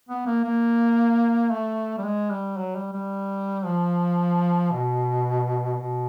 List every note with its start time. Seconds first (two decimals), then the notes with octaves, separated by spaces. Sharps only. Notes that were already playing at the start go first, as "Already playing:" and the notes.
0.09 B3
0.26 A#3
0.44 A#3
1.51 A3
1.98 G3
2.04 G#3
2.31 G3
2.59 F#3
2.76 G3
2.93 G3
3.65 F3
4.72 B2
5.78 B2